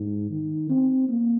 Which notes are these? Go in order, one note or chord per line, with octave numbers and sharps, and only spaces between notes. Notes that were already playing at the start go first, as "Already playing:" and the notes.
Already playing: G#2
D#3
C4
A#3